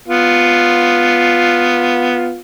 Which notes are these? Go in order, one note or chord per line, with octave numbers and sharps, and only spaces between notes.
B3 F4